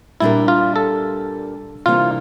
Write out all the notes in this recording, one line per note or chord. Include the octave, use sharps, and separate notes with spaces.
A#2 G3 D4 E4 G4 A#4
F4
A4
C3 E3 G3 A#3 D4 F4